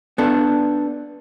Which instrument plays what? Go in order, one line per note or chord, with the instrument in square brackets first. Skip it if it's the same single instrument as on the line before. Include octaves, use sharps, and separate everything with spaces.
[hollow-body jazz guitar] B3 D4 A4